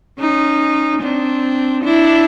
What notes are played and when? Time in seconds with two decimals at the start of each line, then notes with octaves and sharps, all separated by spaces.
0.20 C#4 D#4
1.02 C4 D4
1.84 D4 E4